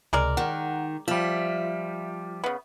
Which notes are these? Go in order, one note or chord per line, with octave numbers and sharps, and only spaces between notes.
C#2 C3 G#3 A#4 D5
D#3 F#5
F3 G3 F4 E5
C#3 B3